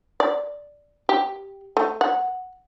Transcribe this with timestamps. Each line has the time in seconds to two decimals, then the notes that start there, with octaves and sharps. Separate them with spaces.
0.20 D5
1.09 G4
1.77 A3
2.01 F#5